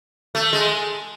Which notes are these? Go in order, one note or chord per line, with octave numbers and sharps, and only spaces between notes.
A3
G#3